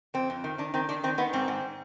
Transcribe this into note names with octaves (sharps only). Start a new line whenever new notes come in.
F2 C4
F2
D#3
D#3 D4
D#3 C4
D#3 D4
D#3 C4
D#3 B3
G#2 C4
G#2